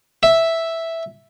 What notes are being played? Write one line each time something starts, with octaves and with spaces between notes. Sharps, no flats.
E5